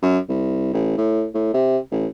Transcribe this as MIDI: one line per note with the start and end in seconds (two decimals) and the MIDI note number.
0.02 0.18 42
0.29 0.71 36
0.73 0.94 33
0.97 1.26 45
1.34 1.49 45
1.54 1.78 48
1.91 2.07 33